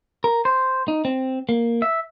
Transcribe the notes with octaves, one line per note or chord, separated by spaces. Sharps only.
A#4
C5
D#4
C4
A#3
E5